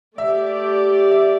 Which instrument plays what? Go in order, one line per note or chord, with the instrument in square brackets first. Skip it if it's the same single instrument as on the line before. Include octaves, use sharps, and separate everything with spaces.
[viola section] A3 G4 D5 [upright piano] E5
[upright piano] E5